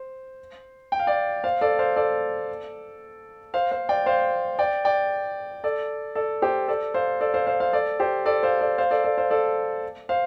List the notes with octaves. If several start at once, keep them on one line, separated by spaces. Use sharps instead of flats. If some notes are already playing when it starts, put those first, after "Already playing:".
Already playing: C5
G5
F5
D5 G5
C5 F5
A4 D5
C5 F5
A4 D5
C5 F5
C5 F5
D5 G5
C5 F5
D5 G5
D5 G5
A4 D5
A4 D5
G4 C5
A4 D5
C5 F5
A4 D5
C5 F5
C5 F5
C5 F5
A4 D5
G4 C5
A4 D5
C5 F5
A4 D5
C5 F5
A4 D5
A4 D5
C5 F5
A4 D5
C5 F5